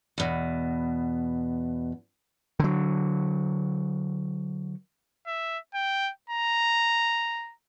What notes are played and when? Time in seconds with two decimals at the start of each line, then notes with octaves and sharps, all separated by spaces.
0.18 E2 B2
2.60 D3 F#3
5.27 E5
5.75 G5
6.30 A#5